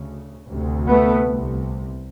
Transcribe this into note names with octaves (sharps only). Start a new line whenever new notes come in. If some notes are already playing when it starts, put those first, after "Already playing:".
Already playing: D2 C#3
D2 C3
A3 B3
C2 C3